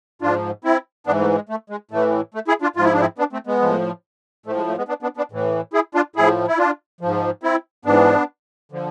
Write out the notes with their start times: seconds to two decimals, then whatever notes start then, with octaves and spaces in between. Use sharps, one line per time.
0.22 G#2 F3 D4 F4
0.64 C4 E4
1.07 G#2 E3 B3 D4
1.21 A3
1.35 G#3
1.49 A3
1.70 G#3
1.91 A2 E3 A3
2.34 A3
2.48 E4 G#4
2.62 D4 F4
2.76 G#2 F3 F4
2.85 E4
2.93 D4
3.00 C4 E4
3.18 B3 D4
3.33 A3 C4
3.47 G#3 B3
3.62 A2 F3
4.46 A2 F3 A3
4.57 G#3
4.68 A3
4.77 G#3 B3
4.88 B3 D4
5.03 B3 D4
5.17 B3 D4
5.32 A2 E3
5.73 E4 G#4
5.95 D4 F4
6.16 A2 F3 E4 G#4
6.48 E4
6.58 D4 F4
7.01 G#2 F3
7.43 C4 E4
7.85 G#2 E3 B3 D4
8.72 D3 F3